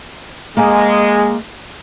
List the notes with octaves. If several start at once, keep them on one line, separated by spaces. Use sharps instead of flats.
G#3 A#3 G#5